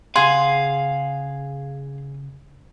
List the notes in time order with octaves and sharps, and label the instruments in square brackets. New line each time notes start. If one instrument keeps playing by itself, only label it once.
[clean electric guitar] C#3 F#5 [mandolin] G#4 [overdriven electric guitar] F5 [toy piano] C6